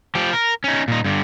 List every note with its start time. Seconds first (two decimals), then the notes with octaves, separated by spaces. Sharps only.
0.15 F3 G4
0.33 A#4
0.64 C#4 D#4
0.88 A#2 D#4
1.05 G2 D3